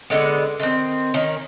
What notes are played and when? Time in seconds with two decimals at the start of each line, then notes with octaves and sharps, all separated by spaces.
0.10 D3 G#3 B3
0.60 D#3 C4
1.14 D#3 C#4